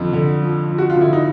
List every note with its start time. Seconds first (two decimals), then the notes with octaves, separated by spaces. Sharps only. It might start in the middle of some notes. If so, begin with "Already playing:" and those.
Already playing: F2 D3
0.13 D3
0.41 F3
0.69 F3
0.78 F#4
0.90 F4
0.97 D3 E4
1.13 D#4